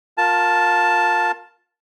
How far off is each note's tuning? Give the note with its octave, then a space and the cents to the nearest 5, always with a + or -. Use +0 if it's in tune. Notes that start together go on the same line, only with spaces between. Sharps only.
F4 +25 A#4 +0 A5 +0